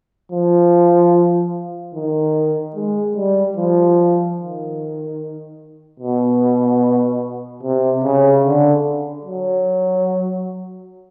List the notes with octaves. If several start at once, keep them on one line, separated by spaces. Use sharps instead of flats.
F3
D#3
G#3
G3
F3
D#3
B2
C3
C#3
D3
F#3